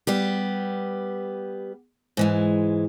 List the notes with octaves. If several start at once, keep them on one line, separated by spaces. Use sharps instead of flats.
G3 B3 G4
G#2 E3 G#3